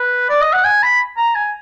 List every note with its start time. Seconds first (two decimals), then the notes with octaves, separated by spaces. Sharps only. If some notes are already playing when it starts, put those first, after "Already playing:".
Already playing: B4
0.29 D5
0.41 D#5
0.53 F#5
0.64 G#5
0.83 B5
1.17 A#5
1.35 G#5